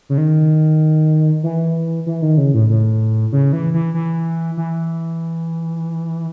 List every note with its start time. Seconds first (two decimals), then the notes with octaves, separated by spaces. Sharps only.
0.09 C#3
0.18 D#3
1.43 E3
2.06 E3
2.22 D#3
2.38 C#3
2.54 A2
2.69 A2
3.32 C#3
3.53 E3
3.74 E3
3.94 E3
4.57 E3